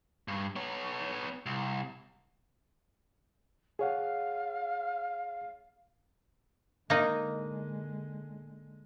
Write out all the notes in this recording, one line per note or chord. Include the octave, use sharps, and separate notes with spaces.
G2
B3 C#5
C2
G#4 C#5 F5 F#5
D3 G#3 A#3 D#4